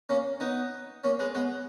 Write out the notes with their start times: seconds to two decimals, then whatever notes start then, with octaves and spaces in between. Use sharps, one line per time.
0.09 A#3 C#4
0.40 B3 D#4
1.04 A#3 C#4
1.19 G#3 B3
1.35 G#3 B3